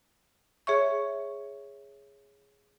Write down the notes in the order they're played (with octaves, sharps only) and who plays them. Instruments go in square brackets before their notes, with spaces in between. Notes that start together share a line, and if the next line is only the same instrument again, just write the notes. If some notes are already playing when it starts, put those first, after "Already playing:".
[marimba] G#4 C#5 E5 C#6